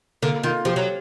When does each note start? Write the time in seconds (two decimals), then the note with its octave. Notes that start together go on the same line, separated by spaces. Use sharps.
0.22 D3 A#3
0.43 D#3 F4
0.65 F3 G4
0.76 F#3